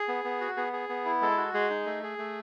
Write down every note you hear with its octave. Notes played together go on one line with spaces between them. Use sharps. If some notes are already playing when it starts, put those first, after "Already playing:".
Already playing: G#4
B3
B3
F#4
B3 G#4
G#4
B3
E4
G#3 A4
F#4
G#3 G#4
D#4
A3
G#4
A3